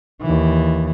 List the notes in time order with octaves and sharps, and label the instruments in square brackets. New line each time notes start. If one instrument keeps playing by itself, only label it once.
[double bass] D#2 E3